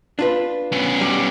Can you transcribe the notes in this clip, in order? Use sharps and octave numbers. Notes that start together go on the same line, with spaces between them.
D4 F4 B4
B3 C#4
G3